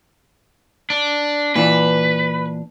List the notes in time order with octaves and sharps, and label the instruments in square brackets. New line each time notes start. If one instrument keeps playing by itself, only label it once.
[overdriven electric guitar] D4
[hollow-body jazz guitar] A#2 E3 D4 [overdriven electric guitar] B4